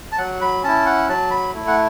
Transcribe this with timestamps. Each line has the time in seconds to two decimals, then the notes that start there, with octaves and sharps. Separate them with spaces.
0.12 A5
0.18 F#3 F#5
0.41 B5
0.64 C#4 E4 A5
0.86 F#5
1.08 F#3 A5
1.31 B5
1.53 A3 E4
1.67 F#5